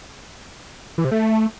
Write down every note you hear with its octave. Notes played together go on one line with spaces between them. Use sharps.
E3
C3
A3